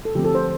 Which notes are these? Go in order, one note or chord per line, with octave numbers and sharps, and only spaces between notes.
A4
D3 F3 A3 C4 G4
A4
C5